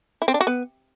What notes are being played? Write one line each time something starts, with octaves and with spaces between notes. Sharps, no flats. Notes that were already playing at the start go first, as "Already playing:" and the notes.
E4
C4
D4
F#4
B3